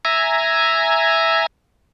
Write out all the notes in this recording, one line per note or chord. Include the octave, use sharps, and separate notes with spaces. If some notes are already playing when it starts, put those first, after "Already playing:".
E5 G#5 A#5